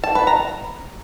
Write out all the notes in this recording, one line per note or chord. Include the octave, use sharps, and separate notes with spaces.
A5
B4
A#5